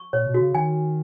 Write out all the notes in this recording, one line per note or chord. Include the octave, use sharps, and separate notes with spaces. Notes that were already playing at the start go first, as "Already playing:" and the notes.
Already playing: C#6
A#2 C#5
B2
F#4
C#3
D#3 G#5